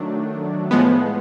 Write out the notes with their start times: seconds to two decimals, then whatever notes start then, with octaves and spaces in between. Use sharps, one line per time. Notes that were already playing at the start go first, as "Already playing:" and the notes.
Already playing: D#3 F#3 A3 D4
0.71 A2 F3 G#3 B3